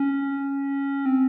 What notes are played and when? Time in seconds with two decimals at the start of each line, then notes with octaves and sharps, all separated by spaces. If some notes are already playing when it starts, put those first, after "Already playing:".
Already playing: C#4
1.06 C4